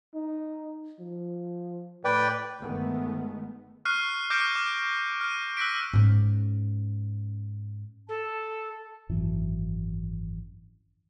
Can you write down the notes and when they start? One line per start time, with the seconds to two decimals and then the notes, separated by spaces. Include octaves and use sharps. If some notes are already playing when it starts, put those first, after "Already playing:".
0.14 D#4
0.99 F3
2.05 A2 B4 D5 G5
2.61 G1 D#3 G#3 A3 B3
3.85 C#6 F6 F#6 C7 D#7
4.30 D6 F6 G6 A#6 C#7 D7
4.56 D6
5.21 F6 D#7
5.57 E6 F#6 A#6 B6 D7
5.93 G#2 C#4
8.09 A4 A5
9.09 G#1 F#2 E3